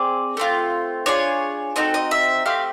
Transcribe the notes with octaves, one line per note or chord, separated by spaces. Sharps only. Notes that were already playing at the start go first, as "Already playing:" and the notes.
Already playing: C4 G#4 D5
A3 C4 F4
D4 F4 G#4 C#5
C4 D#4 F#4 A4 D#5
D#5
E5
A3 C4 G4 F5